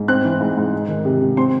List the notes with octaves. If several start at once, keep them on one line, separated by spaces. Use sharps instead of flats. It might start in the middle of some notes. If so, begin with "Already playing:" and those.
Already playing: G#2
C4 F#6
E3
G#2
G#2
G#3
D#3
C3
C3
C4 C6